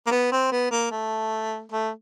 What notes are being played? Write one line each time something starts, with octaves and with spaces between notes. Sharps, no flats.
A#3
B3
C4
B3
A#3
A3
A3